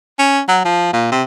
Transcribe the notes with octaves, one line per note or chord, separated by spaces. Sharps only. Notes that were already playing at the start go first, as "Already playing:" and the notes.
C#4
F#3
F3
A#2
C3